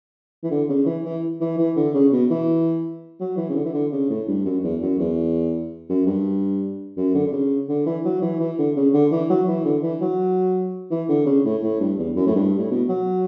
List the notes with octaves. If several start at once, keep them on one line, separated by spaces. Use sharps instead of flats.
E3
D3
C#3
E3
E3
E3
E3
D3
C#3
B2
E3
F#3
E3
C#3
D3
E3
D3
C#3
A2
G2
F#2
E2
F#2
E2
F#2
G2
F#2
D3
D3
C#3
D3
E3
F#3
E3
E3
D3
C#3
D3
E3
F#3
E3
D3
E3
F#3
E3
D3
C#3
A2
A2
G2
E2
F#2
A2
G2
A2
B2
F#3